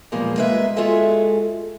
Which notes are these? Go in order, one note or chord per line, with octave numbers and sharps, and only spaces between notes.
E2 A#2 F3 G3 G#3 A#3
G#3 A#3 B4 E5
G#3 F4 F#4 G#4 A4 E5